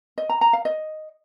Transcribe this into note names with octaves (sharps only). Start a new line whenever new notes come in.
D#5
A#5
A#5
F5
D#5